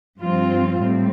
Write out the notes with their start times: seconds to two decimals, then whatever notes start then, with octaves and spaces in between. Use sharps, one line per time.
0.21 G2 F3 C4 F4
0.80 A2 G3 C4